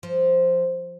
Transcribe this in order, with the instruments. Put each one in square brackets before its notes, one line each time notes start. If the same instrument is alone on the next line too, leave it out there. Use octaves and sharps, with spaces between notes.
[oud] F3